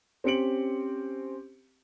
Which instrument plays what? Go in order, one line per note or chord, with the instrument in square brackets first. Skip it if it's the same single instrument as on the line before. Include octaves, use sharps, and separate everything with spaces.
[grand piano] C4 C#4 G4 C#7 D7 F#7